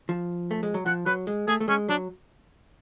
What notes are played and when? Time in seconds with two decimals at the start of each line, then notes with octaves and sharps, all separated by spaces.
0.09 F3
0.51 A3
0.63 G#3
0.74 F#3
0.86 F3 F#5
1.06 F#3 B4
1.27 G#3
1.48 A3 G#4
1.60 A3
1.68 G#3 C#4
1.88 F#3 D4